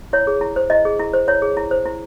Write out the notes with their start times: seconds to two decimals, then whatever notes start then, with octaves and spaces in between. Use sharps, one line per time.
0.13 E4 C#5
0.27 G#4
0.41 E4
0.56 C5
0.70 E4 D#5
0.85 G#4
0.99 E4
1.13 C5
1.28 E4 C#5
1.42 G#4
1.57 E4
1.71 C5
1.86 E4